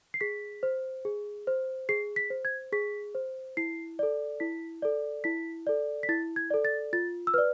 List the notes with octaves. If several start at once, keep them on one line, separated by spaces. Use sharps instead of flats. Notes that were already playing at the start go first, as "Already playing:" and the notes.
C7
G#4 B6
C5
G#4
C5
G#4 C7
B6
C5
G#6
G#4 B6
C5
E4 C7
A4 D5
E4 B6
A4 D5
E4 B6
A4 D5
B6
E4 A6
G#6
A4 D5
A6
F4 A6
E6
B4 D5 F6